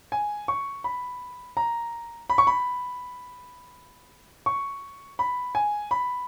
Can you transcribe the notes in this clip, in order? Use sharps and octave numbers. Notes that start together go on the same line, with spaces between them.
G#5
C#6
B5
A#5
B5
C#6
B5
C#6
B5
G#5
B5